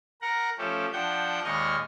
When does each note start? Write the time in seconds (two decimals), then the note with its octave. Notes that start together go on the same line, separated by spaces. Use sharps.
0.22 A#4 F#5 A#5
0.58 F3 A3 C#4 G4 A4
0.93 F3 D4 F#5 G5 G6
1.44 D#2 A#2 G#3 D#5 C#6 F6